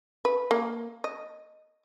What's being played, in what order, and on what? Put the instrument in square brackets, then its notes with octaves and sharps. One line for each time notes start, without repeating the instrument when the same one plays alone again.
[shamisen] B4
A#3
D#5